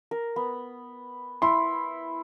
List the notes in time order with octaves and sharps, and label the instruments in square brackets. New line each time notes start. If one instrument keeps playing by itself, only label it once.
[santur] A#4
B3
[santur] E4 [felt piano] C6